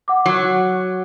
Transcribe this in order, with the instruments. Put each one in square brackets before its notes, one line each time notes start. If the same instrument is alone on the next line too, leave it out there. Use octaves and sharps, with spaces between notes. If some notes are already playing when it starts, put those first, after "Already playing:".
[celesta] F#5 D6
[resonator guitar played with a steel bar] F#3